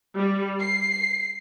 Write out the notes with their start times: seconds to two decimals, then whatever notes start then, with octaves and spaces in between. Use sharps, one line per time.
0.16 G3
0.61 C7